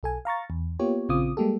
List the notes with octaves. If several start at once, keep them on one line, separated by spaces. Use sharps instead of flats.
B1 A4 G#5
F5 A#5 C#6 A6
E2
A#3 B3 F4 G4 C#5
A#1 C#3 C4 F4 D6 D#6
G3 G#3 A#3 G4 A4